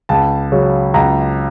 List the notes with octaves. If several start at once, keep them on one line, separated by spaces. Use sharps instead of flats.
C#2 A5
C#3 F#3
C#2 A#5